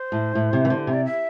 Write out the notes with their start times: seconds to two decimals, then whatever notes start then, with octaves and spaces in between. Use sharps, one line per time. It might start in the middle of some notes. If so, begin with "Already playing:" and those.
Already playing: C5
0.12 A2
0.35 A2
0.53 C3
0.65 E3
0.70 D3
0.87 C3
0.93 D5
1.05 E5